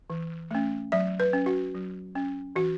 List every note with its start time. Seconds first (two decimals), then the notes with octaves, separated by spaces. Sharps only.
0.10 E3
0.51 A3 C#4
0.92 F#3 E5
1.20 B4
1.33 C#4
1.46 F#4
1.74 F#3
2.15 C#4
2.56 E3 F#4